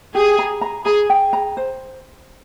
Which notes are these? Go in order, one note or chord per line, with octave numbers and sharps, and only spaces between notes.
G4 G#4
A#5
A#5
G#4 A#5
G5
A#5
C5